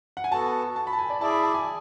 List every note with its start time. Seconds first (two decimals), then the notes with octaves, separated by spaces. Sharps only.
0.17 F#5
0.24 G#5
0.32 B3 F#4 A4 A5
0.76 A5
0.87 B5
0.93 A5
0.98 G#5
1.10 D5
1.20 E4 G#4 D5 A5
1.32 B5
1.43 A5
1.54 G#5